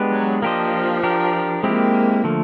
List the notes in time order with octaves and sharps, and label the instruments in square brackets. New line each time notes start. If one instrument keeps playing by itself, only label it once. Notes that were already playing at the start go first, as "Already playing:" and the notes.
Already playing: [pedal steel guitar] G#3 B3 D4 G4 B4
[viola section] F#3
[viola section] F3 [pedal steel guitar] A#3 D4 G4 C5 D#5
[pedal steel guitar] D4 G4 A#4
[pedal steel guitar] G#3 C4 E4 G4 [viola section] A#3
[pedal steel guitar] D3 F3 A3